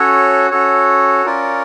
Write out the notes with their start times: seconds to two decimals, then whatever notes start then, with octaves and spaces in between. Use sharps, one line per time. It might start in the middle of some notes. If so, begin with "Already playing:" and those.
Already playing: C#4 F#4 A4 C#5
0.51 C#4 F#4 A4 C#5
1.26 C#4 F4 A#4 D5